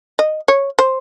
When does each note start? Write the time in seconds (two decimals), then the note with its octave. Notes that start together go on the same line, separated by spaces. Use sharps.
0.19 D#5
0.48 C#5
0.79 C5